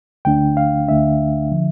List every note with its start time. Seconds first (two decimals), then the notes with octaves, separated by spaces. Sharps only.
0.25 D2 D3 A3 D4 G5
0.57 F5
0.88 D2 D3 A3 D4 E5
1.51 D3 F3